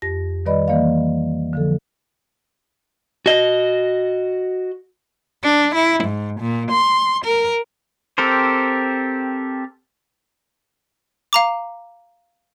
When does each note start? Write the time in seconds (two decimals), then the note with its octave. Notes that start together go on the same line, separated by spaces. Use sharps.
0.02 F2 G4 A#6
0.46 D#3 G3 B4 D5 D#5 B5
0.68 E3 A#3 D5 D#5 F5
1.53 D3 F3 A4
3.26 F#4 D#5
5.42 D4
5.75 E4
6.04 G#2
6.39 A#2
6.70 C6
7.25 A#4
8.18 C4 G4 A4 A#4 C5
11.33 F5 A#5 D6